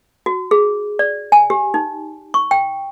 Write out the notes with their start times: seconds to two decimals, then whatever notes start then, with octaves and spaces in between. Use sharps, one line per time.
0.26 F#4
0.51 G#4
0.99 D5
1.32 G#5
1.50 G4
1.74 D#4
2.34 C#6
2.51 G5